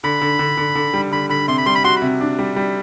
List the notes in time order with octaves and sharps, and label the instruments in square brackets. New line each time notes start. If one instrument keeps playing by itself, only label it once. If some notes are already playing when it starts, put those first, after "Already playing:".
[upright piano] D3 [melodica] B5
[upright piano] D3
D3
D3
D3
G3
[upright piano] D3 [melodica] B5
[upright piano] D3 [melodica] B5
[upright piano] C3 [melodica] C6
[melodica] B5
[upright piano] G3 [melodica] C6
[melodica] B5
[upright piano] F#4 [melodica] C6
[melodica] B5
[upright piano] C3
D4
G3
G3